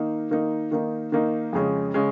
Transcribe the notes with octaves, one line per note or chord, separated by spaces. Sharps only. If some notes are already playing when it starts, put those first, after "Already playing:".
Already playing: D#3 A#3 D#4
D#3 A#3 D#4
D#3 A#3 D#4
D#3 A#3 D#4
F2 C#3 G#3 C#4
C#3 G#3 C#4